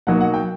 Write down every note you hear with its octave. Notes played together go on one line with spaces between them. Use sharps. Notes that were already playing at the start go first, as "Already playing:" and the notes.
B2 F#3 A#3 D#4 F#5
F#5
G5